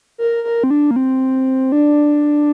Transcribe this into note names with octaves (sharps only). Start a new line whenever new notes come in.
A#4
A#4
C4
D4
A#3
C4
D4